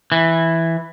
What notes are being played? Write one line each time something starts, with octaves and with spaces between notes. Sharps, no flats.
E3